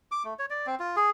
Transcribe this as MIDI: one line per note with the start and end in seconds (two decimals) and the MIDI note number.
0.11 0.23 86
0.24 0.34 57
0.39 0.46 73
0.50 0.67 74
0.67 0.75 60
0.80 0.96 65
0.96 1.10 68